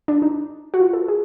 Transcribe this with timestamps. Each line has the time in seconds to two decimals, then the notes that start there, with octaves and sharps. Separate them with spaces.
0.08 D4
0.22 D#4
0.74 F#4
0.80 F4
0.93 A4
1.08 G#4